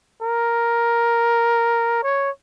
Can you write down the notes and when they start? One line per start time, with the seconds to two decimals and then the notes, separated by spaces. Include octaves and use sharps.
0.22 A#4
2.03 C#5